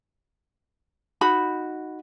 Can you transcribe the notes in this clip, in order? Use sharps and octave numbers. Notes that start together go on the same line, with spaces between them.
D#4 F#4 B5